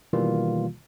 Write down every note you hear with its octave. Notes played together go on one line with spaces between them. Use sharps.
B2 D#3 E3 G3 A#3 F4